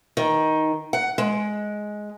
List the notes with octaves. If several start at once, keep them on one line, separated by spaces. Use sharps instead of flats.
D#3
F#5
G#3